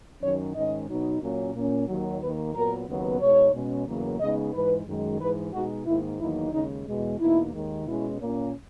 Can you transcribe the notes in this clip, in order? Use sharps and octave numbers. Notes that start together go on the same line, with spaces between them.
F#2 D#3 F#3 C#4 C#5
G#2 D#3 G#3 C#4 D#5
B2 F#3 B3 D#4
A#2 F#3 A#3 C#4
A#2 A#3 C#4
D#2 D#3 F#3
D#2 D#3 A#3 B4
A#2 F#3 B3 A#4
D#2 C#3 F#3 B3
B2 G#3 D#4 C#5
B2 G#3 C#4
E2 C#3 F#3 A#3
C#3 G#3 B3 D#4 D#5
G#2 E3 G#3 B4
F#2 D#3 G#3
G#2 E3 G#3 B4
B2 G#3 D#4 F#4
G#2 D#3 A#3 E4
E2 D#3 F#3 A#3 D#4 E4
D#2 C#3 G#3 D#4
E2 B2 G#3
E2 B2 A#3 D#4 E4
D#2 D#3 G#3
B2 G#3 C#4 E4
A#2 A#3 C#4